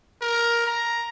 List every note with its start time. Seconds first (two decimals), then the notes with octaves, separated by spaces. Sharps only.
0.22 A#4
0.67 A#5